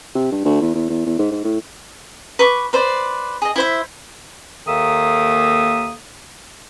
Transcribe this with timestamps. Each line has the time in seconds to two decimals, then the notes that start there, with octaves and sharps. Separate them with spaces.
0.15 C3
0.32 G2
0.45 D2
0.61 E2
0.75 E2
0.89 E2
1.06 E2
1.19 G#2
1.31 G#2
1.44 A2
2.39 B4 C#6 D6
2.73 B4 C5 D5
3.42 G#4 D#5
3.56 E4 C5 E5
4.67 D#2 D#3 A#3 A4 E5 D#6